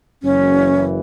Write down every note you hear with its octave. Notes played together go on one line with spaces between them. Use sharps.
F#1 F#2 E3 C#4